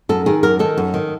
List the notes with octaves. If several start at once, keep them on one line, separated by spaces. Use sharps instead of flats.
F#2 A4
D#3 G#4
F#2 A#4
D#3 A4
F#2
D#3